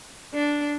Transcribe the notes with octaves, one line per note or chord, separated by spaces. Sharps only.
D4